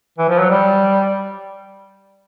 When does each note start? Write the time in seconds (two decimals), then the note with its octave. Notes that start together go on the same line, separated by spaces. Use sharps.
0.18 E3
0.29 F3
0.39 F#3
0.50 G3